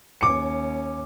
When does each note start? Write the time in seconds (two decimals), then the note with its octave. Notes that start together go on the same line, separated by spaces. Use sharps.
0.21 D#2 C#4 D6 C#7